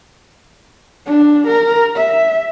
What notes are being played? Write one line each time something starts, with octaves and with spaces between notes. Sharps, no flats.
D4
A#4
E5